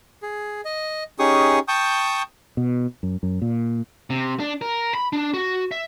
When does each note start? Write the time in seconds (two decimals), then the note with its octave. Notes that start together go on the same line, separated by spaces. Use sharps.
0.23 G#4
0.65 D#5
1.19 C#4 D#4 G4 G#4 C#6 D#6
1.68 G5 A5 C#6 D#6 G6
2.57 B2
3.03 F#2
3.23 F#2
3.42 A#2
4.10 C3
4.40 D4
4.61 A#4
4.95 B5
5.13 D4
5.34 F#4
5.71 E5